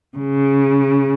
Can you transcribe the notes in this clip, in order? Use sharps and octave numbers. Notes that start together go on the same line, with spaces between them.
C#3